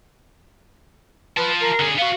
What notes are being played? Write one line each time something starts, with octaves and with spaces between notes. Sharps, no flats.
F4 B4 A5
A#4
D3 G#4
B3 F#4 F5